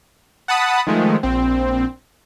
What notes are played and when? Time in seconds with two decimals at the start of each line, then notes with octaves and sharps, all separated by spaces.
0.48 F#5 A5 B5 D#6
0.87 D#3 F3 G#3 A3
1.23 A#1 C4